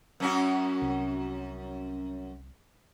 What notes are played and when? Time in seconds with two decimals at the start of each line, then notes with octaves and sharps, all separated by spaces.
0.20 F#2 C#4 F#4
0.82 C2